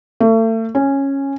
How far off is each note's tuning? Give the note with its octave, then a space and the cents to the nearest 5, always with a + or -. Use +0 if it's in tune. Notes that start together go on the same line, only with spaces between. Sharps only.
A3 +35
C#4 -10